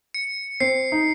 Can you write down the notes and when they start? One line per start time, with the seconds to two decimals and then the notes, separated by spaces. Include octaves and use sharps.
0.14 C#7
0.60 C4 C7
0.92 D#4